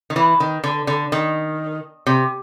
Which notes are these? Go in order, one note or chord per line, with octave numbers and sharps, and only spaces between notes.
D#3
E3
D#3
D3
D3
D#3
C3